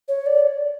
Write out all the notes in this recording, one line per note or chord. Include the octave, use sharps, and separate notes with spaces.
C#5
D5